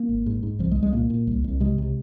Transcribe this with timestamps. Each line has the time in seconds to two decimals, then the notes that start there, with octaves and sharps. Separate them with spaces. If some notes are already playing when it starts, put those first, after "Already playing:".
Already playing: A#3
0.09 G#1
0.26 G#2
0.43 G#2
0.59 C2 F3
0.71 G#3
0.77 C2
0.83 G#3
0.93 A#2 A#3
1.10 A#2
1.27 C2
1.44 C2
1.60 C3 G#3
1.78 C3